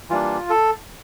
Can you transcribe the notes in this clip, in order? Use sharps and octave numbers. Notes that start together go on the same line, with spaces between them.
E3 G3 A#3 D4 F4
A4